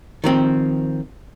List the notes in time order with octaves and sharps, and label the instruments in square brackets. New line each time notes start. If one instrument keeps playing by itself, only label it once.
[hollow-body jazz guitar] D#3 F3 C4